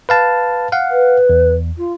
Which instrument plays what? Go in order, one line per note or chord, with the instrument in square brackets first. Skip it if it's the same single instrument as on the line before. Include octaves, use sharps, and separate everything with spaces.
[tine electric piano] B4 F5 A5
F5 F#5
[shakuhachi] B4
[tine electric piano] E2
[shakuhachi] F4